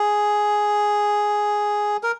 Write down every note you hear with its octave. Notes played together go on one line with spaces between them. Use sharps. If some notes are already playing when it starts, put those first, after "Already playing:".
Already playing: G#4
A#4